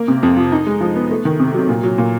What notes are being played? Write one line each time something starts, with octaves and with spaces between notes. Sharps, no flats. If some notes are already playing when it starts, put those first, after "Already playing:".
Already playing: A#3
C3
F2
F3
D#4
G#3
F3
B3
A3
D#3
C3
F#3
A#2
F#3
A#2